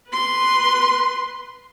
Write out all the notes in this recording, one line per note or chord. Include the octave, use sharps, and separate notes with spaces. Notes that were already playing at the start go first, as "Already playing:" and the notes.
B4 C6